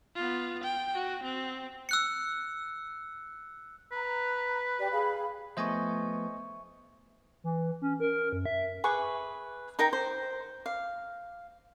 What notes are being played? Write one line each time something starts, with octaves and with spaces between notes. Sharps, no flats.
B3 F4
G5
F#4
C4
E6 F#6 C#7
B4 A#5
G4 D5
G#4 F5 B5
F3 A3 B3 C5 D#5 E5 G#5 C#6
E3
C#4
A#4
F#2
E5
G#4 B4 E5 C#6
D#4 A#4 G5 A#5
C5
F5